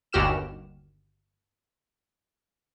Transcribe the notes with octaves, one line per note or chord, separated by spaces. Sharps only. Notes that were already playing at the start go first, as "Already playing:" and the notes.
G1 D#2 F#4 G4 F6 E7